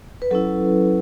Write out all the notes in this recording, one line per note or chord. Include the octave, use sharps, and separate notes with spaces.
B4
F#3 C#4 E4 A4